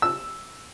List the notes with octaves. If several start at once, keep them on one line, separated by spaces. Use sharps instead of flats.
E6